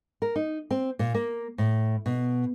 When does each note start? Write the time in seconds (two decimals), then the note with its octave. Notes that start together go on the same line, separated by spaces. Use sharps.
0.22 A#4
0.36 D#4
0.71 C4
0.99 A#2
1.14 A#3
1.58 A2
2.06 B2